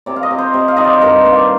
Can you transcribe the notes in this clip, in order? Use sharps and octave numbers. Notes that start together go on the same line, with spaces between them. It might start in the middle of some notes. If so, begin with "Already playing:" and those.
C3 D5
F5
D#5
C3
C5
C3
F5
D#3 D#5
D5
C5
G2 A#4
A#3